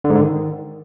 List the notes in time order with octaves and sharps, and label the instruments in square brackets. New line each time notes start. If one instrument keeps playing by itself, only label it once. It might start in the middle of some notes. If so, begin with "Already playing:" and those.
[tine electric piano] D3
G#2
D3
D#3